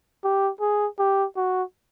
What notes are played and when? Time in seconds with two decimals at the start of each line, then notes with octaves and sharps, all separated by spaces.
0.24 G4
0.61 G#4
0.99 G4
1.36 F#4